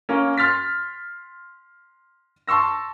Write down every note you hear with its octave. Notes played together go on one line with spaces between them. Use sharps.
A#3 C#4
C6 F6 A6 B6
A5 C6 C#6 E6 A#6